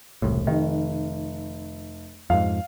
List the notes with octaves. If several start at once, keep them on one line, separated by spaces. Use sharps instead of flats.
E1 C2 A2
F1 D#3
F2 G#2 F5